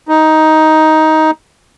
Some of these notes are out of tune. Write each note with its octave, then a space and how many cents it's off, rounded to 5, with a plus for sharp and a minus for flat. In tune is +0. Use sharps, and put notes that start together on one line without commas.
D#4 +10